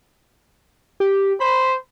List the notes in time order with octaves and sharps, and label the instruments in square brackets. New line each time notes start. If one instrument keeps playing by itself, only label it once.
[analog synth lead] G4
[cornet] C5 [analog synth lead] B5